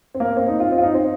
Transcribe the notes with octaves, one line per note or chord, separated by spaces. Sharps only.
C4
A#3
C4
D#4
F4
C4
F4
D#4
C4